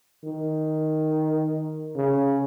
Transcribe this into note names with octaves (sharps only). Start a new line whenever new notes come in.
D#3
C#3